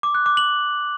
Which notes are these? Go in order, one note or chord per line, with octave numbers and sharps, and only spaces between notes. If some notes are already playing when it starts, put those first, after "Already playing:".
D6
F#6
D6
F#7